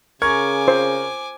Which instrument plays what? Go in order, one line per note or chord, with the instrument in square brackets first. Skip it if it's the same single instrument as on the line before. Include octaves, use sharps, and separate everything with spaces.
[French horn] C#3 [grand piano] A#4 C#6 G#6 [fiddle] G#5 D6
[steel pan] C5